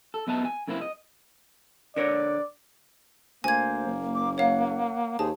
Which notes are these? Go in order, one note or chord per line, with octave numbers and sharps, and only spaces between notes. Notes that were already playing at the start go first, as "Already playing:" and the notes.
A4
F#2 B3 D#5 E5 A5
G#5
F#2 C#3 A#3 C4 E4
D#5
D3 A#4 C#5 D5
D2 A#3 C5 G#5 G#6
F#1
D6
C#5 F5 F#5
D#2 G#4 C5 A5